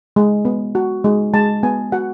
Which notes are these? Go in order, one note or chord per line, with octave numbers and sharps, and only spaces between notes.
G#3
B3
F#4
G#3
G#3 A5
B3 G#5
F#4 F#5